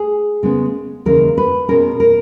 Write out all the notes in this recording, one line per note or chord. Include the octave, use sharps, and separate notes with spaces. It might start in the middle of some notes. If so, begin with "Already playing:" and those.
Already playing: G#4
C#3 G#3 B3
D#2 C#3 E3 G#3 A#4
B4
B2 G#3 C#4 A#4
A#4